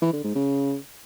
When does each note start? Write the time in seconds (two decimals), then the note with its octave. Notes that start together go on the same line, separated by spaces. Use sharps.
0.02 E3
0.13 D3
0.24 G#2
0.35 C#3